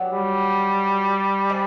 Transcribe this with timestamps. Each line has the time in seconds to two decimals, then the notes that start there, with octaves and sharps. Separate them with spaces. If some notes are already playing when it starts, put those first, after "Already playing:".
Already playing: F#3 B3 D4 G4
0.12 G3
1.49 G#3 C4